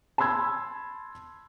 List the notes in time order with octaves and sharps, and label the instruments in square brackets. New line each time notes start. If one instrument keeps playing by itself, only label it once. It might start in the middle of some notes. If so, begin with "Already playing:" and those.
[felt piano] A5 B5 C6 E6 G#6